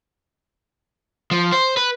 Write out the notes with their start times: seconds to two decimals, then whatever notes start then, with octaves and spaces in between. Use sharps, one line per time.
1.31 F3
1.52 C5
1.77 B4